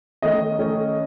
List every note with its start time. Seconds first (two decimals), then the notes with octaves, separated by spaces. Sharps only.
0.22 D#3 A3 C#4 D#5
0.59 D#3 A3 C#4